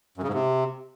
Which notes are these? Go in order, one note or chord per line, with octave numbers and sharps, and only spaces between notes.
F#2
C#3
G#2
C3